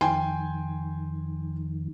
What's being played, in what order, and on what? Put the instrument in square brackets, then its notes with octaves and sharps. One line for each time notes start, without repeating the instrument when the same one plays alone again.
[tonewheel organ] F2 D#3 [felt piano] G5 G#5 C6